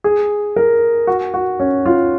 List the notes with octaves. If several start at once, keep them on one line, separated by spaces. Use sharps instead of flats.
G#4
A#4
F#4
F#4
C#4
F4